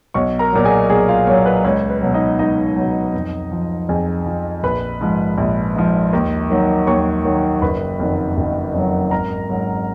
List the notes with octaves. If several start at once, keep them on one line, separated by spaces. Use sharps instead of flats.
B1 C#5 C#6
A#4 A#5
A#2 F#3
G#4 G#5
B1 G#4 G#5
F4 F5
A#2 F#3 C#5
B4
C#2 C#5
B4
B2 F#3
D#4 D#5
C#2 D#4 D#5
B2 F#3
F2
F3
F2 G#4 G#5
F3
A#1 B4 B5
G#2 F3
A#1
G#2 F3
D#2
D#3 F#3
D#2 C#5 C#6
D#3 F#3
F#1 B4 B5
F2 D#3 F#3
F#1
F2 D#3 F#3
G#1 A#4 A#5
G#2 F#3